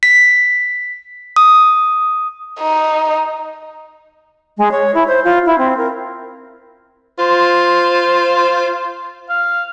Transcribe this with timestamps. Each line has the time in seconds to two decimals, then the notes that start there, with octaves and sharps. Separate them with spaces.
0.03 B6
1.36 D#6
2.60 D#4
4.57 G#3
4.71 C#5
4.94 E4
5.07 C5
5.24 F4
5.46 E4
5.58 C4
5.77 A#4
7.19 F4 C5
9.29 F5